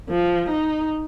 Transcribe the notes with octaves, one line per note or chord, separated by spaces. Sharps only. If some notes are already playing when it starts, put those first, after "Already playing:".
F3
D#4